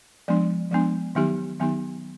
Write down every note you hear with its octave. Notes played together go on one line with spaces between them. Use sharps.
F3 G#3 B3 D4
F3 G#3 B3 D4
D#3 F#3 B3 D#4 G4
D#3 F#3 B3 D#4 G4